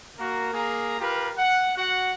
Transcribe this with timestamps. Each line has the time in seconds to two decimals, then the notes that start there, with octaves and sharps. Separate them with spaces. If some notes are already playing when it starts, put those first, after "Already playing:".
0.19 A#3 F#4 A#4
0.54 A#3 G#4 A#5
0.99 F4 G4 A#4 B4
1.38 F#5
1.77 F#4 F#5